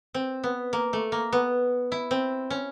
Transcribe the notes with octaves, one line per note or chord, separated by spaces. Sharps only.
C4
B3
A#3
A3
A#3
B3
E4
C4
C#4